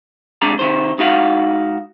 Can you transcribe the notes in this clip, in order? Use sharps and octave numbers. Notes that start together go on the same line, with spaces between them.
C3 G#3 D4 D5 A#5
C3 D#3 C5
G#2 D#4 F#4 F5 F#5